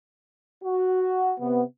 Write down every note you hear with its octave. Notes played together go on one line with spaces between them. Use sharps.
F#4
C3 B3